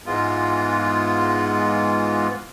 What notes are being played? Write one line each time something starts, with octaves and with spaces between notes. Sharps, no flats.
G#2 E3 G#3 B3 F4